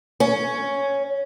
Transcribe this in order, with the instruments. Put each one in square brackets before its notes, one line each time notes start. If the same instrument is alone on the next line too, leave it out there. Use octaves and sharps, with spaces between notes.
[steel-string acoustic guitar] C#4